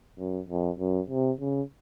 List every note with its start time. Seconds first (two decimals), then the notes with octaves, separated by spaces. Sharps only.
0.19 F#2
0.49 F2
0.79 F#2
1.10 C3
1.41 C#3